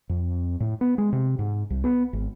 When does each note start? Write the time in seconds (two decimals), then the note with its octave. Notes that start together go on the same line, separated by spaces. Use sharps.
0.09 F2
0.60 A2
0.81 B3
0.98 G#3
1.13 C3
1.39 G#2
1.70 C2
1.84 B3
2.13 G#1